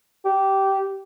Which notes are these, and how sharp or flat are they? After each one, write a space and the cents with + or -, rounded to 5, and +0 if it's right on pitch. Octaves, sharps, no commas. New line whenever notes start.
G4 -15